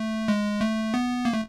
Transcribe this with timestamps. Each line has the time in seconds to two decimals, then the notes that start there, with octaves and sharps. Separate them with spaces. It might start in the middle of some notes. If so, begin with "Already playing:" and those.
Already playing: A3
0.28 G#3
0.61 A3
0.94 B3
1.25 A#3
1.34 A3